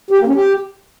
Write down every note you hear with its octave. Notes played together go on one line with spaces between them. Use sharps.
G4
A#3
C#4
G4